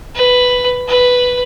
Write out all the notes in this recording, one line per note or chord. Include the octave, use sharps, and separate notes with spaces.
B4
B4